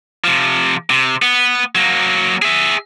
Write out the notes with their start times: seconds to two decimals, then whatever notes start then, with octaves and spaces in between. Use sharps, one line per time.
0.24 C3 F3
0.90 C3
1.22 B3
1.75 F#3 A#3
2.42 G#4 E5